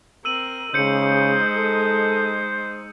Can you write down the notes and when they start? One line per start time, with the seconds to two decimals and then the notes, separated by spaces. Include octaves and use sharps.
0.25 C4 A#4 E6 D#7 F#7
0.74 C#3 G#3 D#4 C5 G6 C#7
1.56 A4